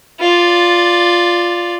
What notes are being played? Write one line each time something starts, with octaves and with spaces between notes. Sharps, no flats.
F4 D5